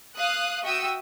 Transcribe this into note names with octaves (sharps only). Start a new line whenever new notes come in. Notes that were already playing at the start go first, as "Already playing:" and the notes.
F5 D#6 F#6
F#4 E5 G5 D#6 E6